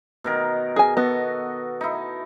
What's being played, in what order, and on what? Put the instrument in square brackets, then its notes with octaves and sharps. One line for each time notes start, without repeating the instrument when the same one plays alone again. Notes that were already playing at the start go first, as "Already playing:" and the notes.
[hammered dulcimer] B2 D#3 A#4
[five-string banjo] G#4 G#5
[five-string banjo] B3 [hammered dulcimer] F#4 A4 D#5
[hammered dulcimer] D#4 E4